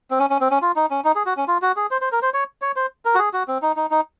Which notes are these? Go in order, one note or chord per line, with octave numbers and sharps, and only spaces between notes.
C4
C#4
C#4
C4
C#4
F4
D#4
C#4
D#4
G#4
F#4
C#4
F4
F#4
G#4
C5
C5
A#4
C5
C#5
C#5
C5
A#4
F#4
G#4
F#4
C4
D#4
D#4
D#4